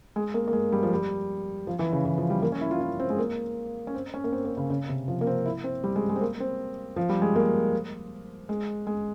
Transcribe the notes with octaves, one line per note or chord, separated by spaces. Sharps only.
G#3
A#3
A#3
G#3
G3
F3
G3
F3
E3
C#3
E3
F3
G3
A#3
C#4
E4
F4
E4
C4
G#3
A#3
C#4
C4
C#4
A#3
C4
A#3
C#3
C#3
C3
F3
A#3
C4
E4
C4
G3
G#3
G#3
C4
A#3
C4
F3
G3
G#3
A#3
G#3
G#3